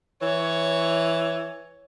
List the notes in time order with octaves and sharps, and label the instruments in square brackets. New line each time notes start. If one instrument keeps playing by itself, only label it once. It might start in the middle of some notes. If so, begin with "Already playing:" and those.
[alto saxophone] E3 [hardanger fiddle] C#5